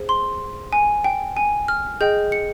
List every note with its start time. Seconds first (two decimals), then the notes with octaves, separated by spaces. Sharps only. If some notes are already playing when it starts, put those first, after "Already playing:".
Already playing: G#4 C5
0.09 C6
0.73 G#5
1.04 G5
1.37 G#5
1.68 F6
2.01 G#4 D#5 G5 G6
2.32 C#7